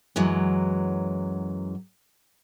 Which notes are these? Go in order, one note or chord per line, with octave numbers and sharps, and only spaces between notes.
F#2 E3 F#3 G#3